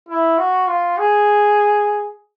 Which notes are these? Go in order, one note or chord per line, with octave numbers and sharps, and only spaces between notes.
E4
F#4
F4
G#4